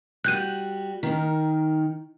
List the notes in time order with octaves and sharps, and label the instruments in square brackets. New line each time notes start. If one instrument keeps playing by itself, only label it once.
[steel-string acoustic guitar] G3 F#4 [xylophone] F#6 G6 D#7
[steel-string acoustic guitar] D#3 A#4